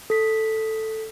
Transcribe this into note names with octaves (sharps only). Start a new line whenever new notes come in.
A4 B6